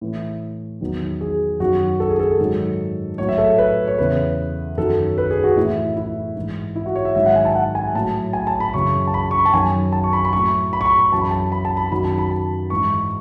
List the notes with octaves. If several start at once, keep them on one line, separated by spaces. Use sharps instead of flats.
A2 E3
E2 D#3 F#3
G#4
F#2 D#3 F#3 F#4
A4
G#4
A4
G#2 D#3 F#3
A2 F#3 C#5
E5
A4
B4
C#5
E2 C#3 E3 B4
F#2 D#3 F#3 A4
B4
G#4
F#4
A2 E3 E4
E4
G#2 E3
E4
F#4
C#5
E5
G#2 D#3 F#3 E5
F#5
G#5
A5
F#5
G#5
A2 F#3 A5
G#5
A5
B5
F#2 C#3 E3 C#6
A5
B5
C#6
B5
A5
F#2 D#3 F#3 G#5
A5
C#6
B5
B5
A2 F#3 C#6
B5
C#6
B5
B5
F#2 E3 A5
B5
A5
B5
A5
B5
F#2 D#3 F#3 B5
A5
B5
A5
G#2 E3 C#6